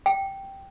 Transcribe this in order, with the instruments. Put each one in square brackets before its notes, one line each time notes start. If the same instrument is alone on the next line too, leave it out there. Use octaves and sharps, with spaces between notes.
[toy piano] G5